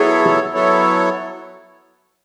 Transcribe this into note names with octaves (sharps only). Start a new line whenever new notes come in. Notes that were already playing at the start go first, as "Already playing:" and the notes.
Already playing: F#3 B3 E4 G#4 A4 C#5
F#3 B3 E4 A4 C#5